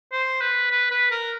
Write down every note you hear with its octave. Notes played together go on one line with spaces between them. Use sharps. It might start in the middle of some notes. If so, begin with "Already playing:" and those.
C5
B4
B4
B4
A#4